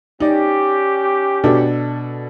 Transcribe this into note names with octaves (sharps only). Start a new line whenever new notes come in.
C#4 D#4 G4 D5
B2 D4 A4